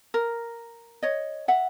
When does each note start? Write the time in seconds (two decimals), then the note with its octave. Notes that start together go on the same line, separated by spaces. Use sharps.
0.14 A#4
1.03 C#5 D#5
1.48 E5 F#5